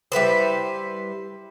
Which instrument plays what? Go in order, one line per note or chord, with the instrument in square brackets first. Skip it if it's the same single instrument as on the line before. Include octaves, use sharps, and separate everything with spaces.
[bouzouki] G3 E4 B4 C5